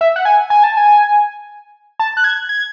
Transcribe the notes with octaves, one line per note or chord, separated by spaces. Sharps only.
E5
F#5
G#5
G#5
A5
G#5
A5
F#6
G#6
G#6